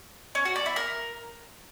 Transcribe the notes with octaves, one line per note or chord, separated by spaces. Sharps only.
C#4
F#4
D5
E4
A#4